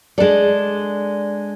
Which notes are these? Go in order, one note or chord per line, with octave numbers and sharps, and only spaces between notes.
G#3 D4 A4 D5